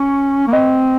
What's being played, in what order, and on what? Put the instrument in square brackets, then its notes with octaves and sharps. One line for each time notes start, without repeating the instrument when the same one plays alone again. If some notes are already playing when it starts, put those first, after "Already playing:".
Already playing: [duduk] C#4 [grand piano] C#6
[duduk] A#3
[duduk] C4 [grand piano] D#5